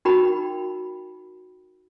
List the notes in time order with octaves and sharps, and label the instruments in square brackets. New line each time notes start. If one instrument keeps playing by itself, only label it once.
[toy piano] D#4 F#4 A#4 G5 B5